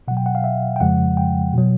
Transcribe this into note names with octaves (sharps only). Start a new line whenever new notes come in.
B2 F#3 F#5
G5
F#5
F5
E5
G5
F2 C#3 F3 G#3 F#5
G5
B2 F#3